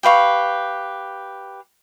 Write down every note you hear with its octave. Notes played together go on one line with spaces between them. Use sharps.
G4 B4 F5 C#6